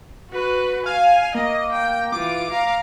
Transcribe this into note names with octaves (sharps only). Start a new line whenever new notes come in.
F#4 B4
F5 G#5
A#3 D#5
G5
E3 F4 D6
F5 A#5